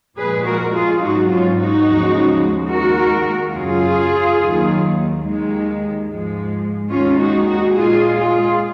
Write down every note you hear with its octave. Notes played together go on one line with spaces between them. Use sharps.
A#2 F3 G#3 G#4 B4
F#4 A#4
F4 G#4
G#2 F#3 D#4 F#4
C#4 F4
D#4 F#4
D#2 C#3 F3 G#3
D#2 D#3 G#3 F#4 A#4
F#2 C#3 F#3 F4 G#4
D#2 D#3 F#3
D#2 D#3 G#3
G#2 F3 G#3
D#2 D#3 G#3 C#4 F4
D#4 F#4
D#4 F#4
A#2 G#3 F4 G#4
F4 G#4